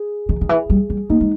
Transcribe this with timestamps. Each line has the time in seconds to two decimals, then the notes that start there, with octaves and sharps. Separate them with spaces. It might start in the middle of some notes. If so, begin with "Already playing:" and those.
Already playing: G#4
0.29 D#3
0.41 D#3
0.49 E3
0.70 G3
0.90 G3
1.10 A#3 D#4
1.21 G#3